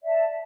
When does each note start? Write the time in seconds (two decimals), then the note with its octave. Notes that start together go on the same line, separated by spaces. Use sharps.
0.01 D5
0.03 E5
0.06 A5